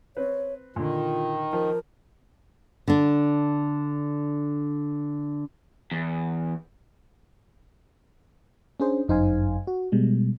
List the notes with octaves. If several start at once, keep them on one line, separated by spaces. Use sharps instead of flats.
C4 B4 C#5
A#2 D3 D#3 F4
F3 A#4
D3 D4
E2
C#4 D4 G#4 C5
G1 F#2 D#4 C5 F5 G#5
F#4
B2 G3 G#3